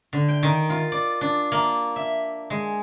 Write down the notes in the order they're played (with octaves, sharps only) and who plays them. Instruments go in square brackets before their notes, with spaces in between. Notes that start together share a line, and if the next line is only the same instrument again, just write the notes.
[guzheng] D3
G5
D#3
F4
D5
D4
A#3
E5
G#3